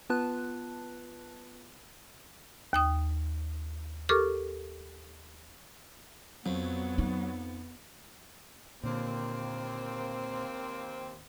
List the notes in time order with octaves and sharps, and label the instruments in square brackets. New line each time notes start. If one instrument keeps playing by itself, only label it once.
[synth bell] B3 F4 B4 A5 F#6
[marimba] D#2 G5 D#6
G4 A4 A#4 C#6 D6 F6
[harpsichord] F2 [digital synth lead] F#3 [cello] B3
[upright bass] D#4
[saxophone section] D#2 A#3 C4 [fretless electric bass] A#2 D3